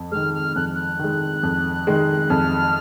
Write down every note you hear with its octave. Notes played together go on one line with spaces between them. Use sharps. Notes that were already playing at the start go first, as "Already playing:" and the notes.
Already playing: F2
D#3 G#3 F6
F6
F2 F#6
F#6
D#3 G#3
F2
D#3 G#3
F2 F6